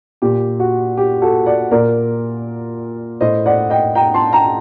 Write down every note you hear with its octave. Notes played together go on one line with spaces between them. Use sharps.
A#2 G4
F#4
G4
F#4 A4
D5 F#5
A#2 A#4 D5
A2 C5 D#5
D5 F#5
D#5 G5
G5 A#5
A5 C6
G5 A#5